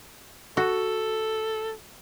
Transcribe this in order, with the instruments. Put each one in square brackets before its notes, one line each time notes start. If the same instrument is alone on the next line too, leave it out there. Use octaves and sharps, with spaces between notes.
[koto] F#4 [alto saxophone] A4